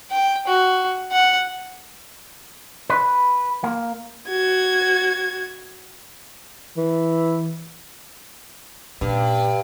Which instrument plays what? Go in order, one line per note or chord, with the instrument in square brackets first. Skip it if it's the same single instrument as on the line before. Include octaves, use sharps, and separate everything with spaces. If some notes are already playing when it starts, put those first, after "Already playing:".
[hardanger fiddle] G5
F#4
F#5
[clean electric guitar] B4
A#3
[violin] F#4 G#6
[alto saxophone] E3
[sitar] G2 [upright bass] A#2 C#3